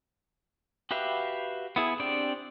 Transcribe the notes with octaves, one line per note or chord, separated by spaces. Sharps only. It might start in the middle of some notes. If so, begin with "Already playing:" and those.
F#4 G4 B4 E5 F5
B3 E4 G#4
C4 D4 G4 D5